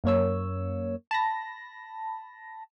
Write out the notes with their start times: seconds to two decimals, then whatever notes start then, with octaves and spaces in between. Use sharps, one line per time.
0.04 F#2 A#3 C#5 E6
1.11 A5 B5 A#6